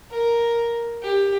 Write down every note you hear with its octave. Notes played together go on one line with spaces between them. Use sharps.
A#4
G4